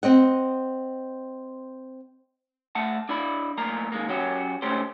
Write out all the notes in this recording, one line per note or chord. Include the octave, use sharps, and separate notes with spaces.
C4 D#5 F#5
A3 F#5 A5
D4 E4 D5 B5
B1 A2 A#3 A#5
D#3 G#3 A#3
F#3 C#4 F#4 G4
C#2 A2 A3 C#4 G4 C5